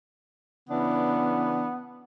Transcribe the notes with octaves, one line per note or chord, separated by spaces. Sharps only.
C#3 E3 B3 D4